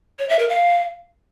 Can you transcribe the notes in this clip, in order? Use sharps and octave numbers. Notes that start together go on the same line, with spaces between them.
C#5
E5
A#4
F5